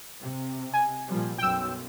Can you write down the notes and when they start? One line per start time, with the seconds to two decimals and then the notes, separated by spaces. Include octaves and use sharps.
0.20 C3
0.74 G#5
1.07 A#2 F3 G3
1.38 B1 F#2 G5 E6